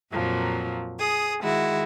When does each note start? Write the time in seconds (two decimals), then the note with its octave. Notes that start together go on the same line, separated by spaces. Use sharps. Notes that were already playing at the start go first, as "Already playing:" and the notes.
0.11 F2 A#2 F3 F#3
0.99 G#4 D#6
1.39 D#3 G#3 E4 F#4